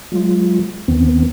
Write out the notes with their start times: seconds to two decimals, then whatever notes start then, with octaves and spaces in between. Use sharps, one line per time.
0.12 F#3 G#3 F4
0.88 D#2 D#3 B3 C4